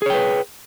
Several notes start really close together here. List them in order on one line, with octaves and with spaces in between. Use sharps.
G#4 C#5 G5 B4